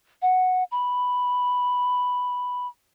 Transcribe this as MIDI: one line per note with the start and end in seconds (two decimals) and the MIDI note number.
0.22 0.64 78
0.71 2.67 83